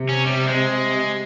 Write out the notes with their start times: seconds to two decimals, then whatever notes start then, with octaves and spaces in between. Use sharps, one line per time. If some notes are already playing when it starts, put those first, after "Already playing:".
Already playing: C3
0.09 C#4
0.25 G3
0.48 G#3